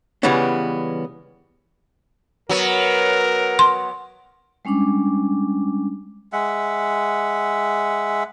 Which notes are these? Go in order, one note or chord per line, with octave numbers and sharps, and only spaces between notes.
C#3 E3 G3 G#3 B3 C#4
F#3 B3 A#4
C6
G3 G#3 C#4 D4 D6
G#3 E5 F#5